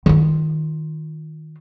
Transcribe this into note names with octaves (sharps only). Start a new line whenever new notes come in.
D#3 F4